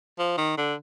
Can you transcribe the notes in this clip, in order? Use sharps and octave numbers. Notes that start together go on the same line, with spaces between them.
F3
D#3
D3